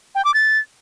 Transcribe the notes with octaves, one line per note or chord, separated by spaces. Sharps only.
G5
D6
A6